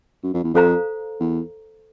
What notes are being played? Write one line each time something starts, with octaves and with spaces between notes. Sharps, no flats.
F#2
F2
E2
F2 A4 C5 F5 A#5
E2